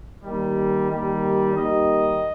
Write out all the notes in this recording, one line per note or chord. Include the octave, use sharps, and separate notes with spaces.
D#2 D#3 G3
D#2 D#3 G3
D#2 D#3 G3 D#5